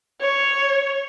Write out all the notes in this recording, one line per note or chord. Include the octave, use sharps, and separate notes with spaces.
C#5